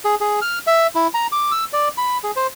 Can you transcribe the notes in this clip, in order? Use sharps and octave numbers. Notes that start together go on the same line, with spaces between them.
G#4
G#4
F6
E5
E4
A#5
D6
E6
D5
B5
G#4
C5